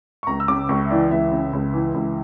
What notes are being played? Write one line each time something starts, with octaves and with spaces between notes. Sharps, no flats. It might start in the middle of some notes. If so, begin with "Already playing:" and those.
C#6
C#2 A#5
E6
C#3 D6
C#2 C#6
E5
E3 D5
C#2 E5
C#3
C#2
E3
C#2